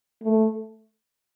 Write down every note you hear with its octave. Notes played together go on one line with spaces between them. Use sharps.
A3